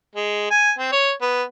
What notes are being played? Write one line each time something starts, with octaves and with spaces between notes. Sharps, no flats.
G#3
G#5
C4
C#5
B3